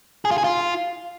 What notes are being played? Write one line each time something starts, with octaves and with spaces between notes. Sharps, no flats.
G#4
F4
G#4
F4